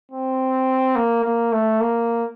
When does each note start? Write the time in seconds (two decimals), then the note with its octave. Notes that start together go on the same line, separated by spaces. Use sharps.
0.12 C4
0.96 A#3
1.25 A#3
1.52 A3
1.80 A#3